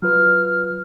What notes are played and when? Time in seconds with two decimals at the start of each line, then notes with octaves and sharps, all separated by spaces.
0.02 F#3 F4 B4 F6